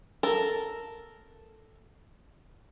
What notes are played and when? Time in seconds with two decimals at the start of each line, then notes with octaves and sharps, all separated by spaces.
0.23 A4 A#4